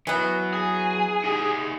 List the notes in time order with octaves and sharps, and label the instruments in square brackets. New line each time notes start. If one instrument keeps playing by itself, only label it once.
[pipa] E3 B3 [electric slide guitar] F#3
[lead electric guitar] G#4
[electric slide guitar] D#4 G4 G#5